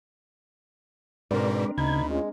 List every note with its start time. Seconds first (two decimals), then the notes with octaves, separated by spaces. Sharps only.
1.31 G#2 B2 G#3 C4 D4 A#4 B4 D5
1.78 D2 C#3 D#4 B5 G#6
2.09 G#3 C#4 F4